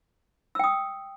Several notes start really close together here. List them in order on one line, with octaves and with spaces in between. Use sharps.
E6 G5 D#6